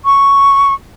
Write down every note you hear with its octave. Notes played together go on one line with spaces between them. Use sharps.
C#6